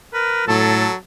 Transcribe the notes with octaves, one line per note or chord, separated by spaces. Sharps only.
A#4 B4
A2 F#3 A4 A5